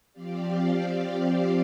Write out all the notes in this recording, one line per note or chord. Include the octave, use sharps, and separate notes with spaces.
F3 C4 G4 D5 F5